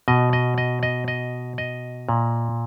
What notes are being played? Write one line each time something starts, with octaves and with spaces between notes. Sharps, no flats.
B2 D#5
D#5
D#5
D#5
D#5
D#5
A#2